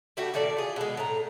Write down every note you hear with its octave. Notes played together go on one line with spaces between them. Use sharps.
G3 A3 F#4 G4
A#2 D#3 A4 D5
F4 G#4
B2 G#3
A2 A#5